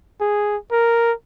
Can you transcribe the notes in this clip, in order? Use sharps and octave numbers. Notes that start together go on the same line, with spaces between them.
G#4
A#4